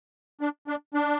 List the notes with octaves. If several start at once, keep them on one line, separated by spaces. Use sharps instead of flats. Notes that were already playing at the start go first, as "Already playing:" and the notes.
D4
D4
D4